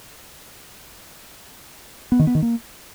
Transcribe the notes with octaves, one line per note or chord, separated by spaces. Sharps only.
B3
D#3
B3
D#3
A#3